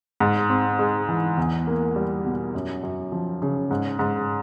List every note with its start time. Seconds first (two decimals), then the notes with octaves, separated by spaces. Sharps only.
0.20 G#2
0.50 C4
0.79 G#3
1.09 E3
1.37 E2
1.67 A#3
1.96 G3
2.25 B2
2.54 F#2
2.83 F#2
3.12 F3
3.42 C#3
3.71 G#2
3.99 G#2